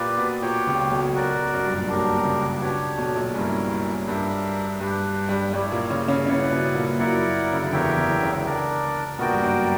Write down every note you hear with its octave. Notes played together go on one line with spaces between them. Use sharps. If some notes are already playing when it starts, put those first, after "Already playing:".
Already playing: A#2 A#3 G4 B4 D5
B2 B3
A#2 A#3 G4 C#5 G5
C#2 C#3
B1 B2
F#4 A#4 D5
F#2
G2
A#2
B1 B2 D4 G4 A#4
B2
C#2 C#3
B2 B3 D4 G4 C#5
B1 B2
A#1 A#2
G2 C#4 E4 A#4
G2 D4 A#4 E5
G2 D4 G4 B4
G2 G3
G2 G3 E4 G4 C#5
A#2 A#3
C#3 C#4
C#3 C#4
C#3 C#4 E4 B4 D5 F#5
B2 B3
A#2 A#3
F#2 F#3 E4 A#4 D5 F#5
C#3
D3
E2 E3 G4 A#4 C#5 E5 G5
E2 E3
C#2 C#3
D4 A#4 D5
A#1 A#2 B3 F#4 A#4 D5 G5
G2
F#2